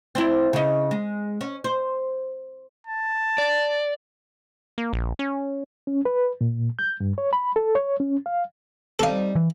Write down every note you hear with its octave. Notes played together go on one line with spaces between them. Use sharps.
C4 D4 E4
C#3 D#4
G#3
C#4
C5
A5
D5
A#3
A#1
C#4
C#4
B4
A#2
G6
G2
C#5
B5
A4
C#5
C#4
F5
G3 C4 D#4 A4 F5
E3